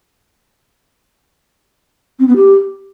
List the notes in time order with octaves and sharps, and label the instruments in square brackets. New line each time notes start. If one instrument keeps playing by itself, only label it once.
[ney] C4
B3
G4